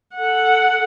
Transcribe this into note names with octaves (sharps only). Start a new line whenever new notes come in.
A4 F#5